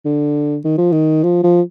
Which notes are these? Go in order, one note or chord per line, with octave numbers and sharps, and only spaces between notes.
D3
D#3
F3
D#3
F3
F3